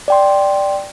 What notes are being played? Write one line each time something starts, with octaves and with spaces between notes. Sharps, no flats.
D5 G5 C6